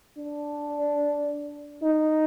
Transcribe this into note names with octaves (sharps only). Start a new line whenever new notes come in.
D4
D#4